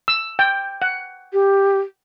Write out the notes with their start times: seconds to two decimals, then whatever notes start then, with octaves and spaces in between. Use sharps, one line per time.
0.08 E6
0.39 G5
0.82 F#5
1.33 G4